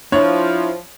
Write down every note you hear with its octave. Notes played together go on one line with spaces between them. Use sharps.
F3 D4 E4 C#5